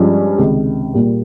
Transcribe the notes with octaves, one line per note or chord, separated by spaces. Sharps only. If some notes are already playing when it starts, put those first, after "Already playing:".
Already playing: G2 F3 G#3 C#4 F4
C#2 C3 D#3
A#2 G3 A#3